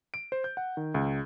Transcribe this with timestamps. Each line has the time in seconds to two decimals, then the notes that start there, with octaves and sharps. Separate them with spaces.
0.14 D7
0.32 C5
0.44 G6
0.57 F#5
0.77 D#3
0.94 C#2